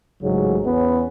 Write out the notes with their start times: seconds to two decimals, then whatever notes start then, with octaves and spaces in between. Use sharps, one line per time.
0.23 A1 G#2 C#3 F#3
0.65 E2 B3 C#4